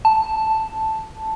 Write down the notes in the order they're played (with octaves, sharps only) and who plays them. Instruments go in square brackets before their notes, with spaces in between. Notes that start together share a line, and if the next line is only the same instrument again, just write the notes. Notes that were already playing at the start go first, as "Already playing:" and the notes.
[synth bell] A5